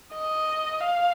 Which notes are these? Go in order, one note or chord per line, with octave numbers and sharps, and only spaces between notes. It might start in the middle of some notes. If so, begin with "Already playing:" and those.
D#5
F5